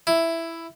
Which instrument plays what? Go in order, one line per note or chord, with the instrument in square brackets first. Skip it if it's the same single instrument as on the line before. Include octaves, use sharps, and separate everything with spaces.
[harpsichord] E4